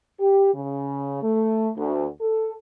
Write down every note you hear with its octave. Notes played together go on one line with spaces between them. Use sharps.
G4
C#3
A3
D2
A4